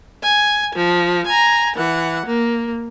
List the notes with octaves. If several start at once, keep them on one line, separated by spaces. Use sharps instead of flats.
G#5
F3
G#5 A#5
E3 F#5
A#3